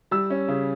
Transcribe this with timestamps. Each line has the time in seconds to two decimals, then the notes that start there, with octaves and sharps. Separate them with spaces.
0.11 G3 E6
0.30 C#4
0.48 C#3